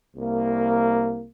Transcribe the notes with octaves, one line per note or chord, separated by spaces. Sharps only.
C2 A#3